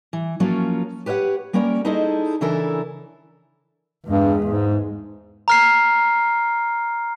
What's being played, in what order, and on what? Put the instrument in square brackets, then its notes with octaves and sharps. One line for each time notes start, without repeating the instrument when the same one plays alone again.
[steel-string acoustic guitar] E3
F3 F#3 A#3 C#4 F4
G4 B4 C#5 E5 F#5
G3 A#3 C#4 A#4 C#5 D5
D#4 E4 G#4 A4 C5 D#5
C#3 E3 D4 E4 A4 A#4
[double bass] E2 G#3 [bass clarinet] G2
[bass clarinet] G#2
[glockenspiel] A#5 F6 C7